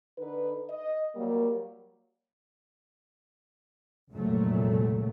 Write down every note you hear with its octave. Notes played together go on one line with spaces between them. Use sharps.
D3 D#4 B4
D#5
F#3 G3 A#3
F1 C#2 F#2 A#2 F#3 A3